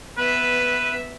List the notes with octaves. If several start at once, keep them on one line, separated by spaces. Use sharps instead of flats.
B3 B4 E5